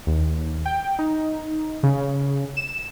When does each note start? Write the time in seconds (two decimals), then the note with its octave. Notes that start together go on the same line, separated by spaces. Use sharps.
0.07 D#2
0.65 G5
0.99 D#4
1.83 C#3
2.57 E7